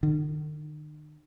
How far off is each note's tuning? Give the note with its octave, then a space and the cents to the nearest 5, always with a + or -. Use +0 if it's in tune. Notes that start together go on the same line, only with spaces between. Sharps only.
D#3 -45